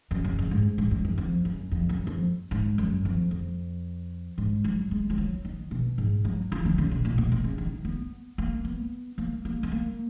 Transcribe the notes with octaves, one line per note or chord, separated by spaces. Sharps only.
F#2
C#3
F#2
G#2
G#2
F#2
F#2
F2
F#2
F2
F#2
F2
G#2
F#2
F2
F2
G#2
F#3
G#3
F3
F#3
D#3
B2
G#2
F#3
F3
D#3
C#3
B2
A#2
B2
B2
C#3
D#3
B3
A#3
B3
A#3
A#3
B3
A#3